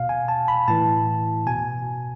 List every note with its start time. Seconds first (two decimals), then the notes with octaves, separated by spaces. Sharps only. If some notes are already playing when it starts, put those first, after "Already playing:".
Already playing: B2 F5
0.09 G#5
0.28 A5
0.48 B5
0.68 A2 E3 A5
1.47 B2 G#5